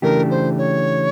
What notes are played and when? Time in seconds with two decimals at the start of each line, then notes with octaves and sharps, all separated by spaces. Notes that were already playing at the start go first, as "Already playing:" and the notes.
0.02 C#3 E3 A3 D4 G4 A#4
0.30 C5
0.58 C#5